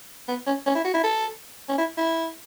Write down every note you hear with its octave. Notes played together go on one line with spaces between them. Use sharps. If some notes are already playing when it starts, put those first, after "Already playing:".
B3
C#4
C#4
E4
F#4
E4
A4
C#4
E4
E4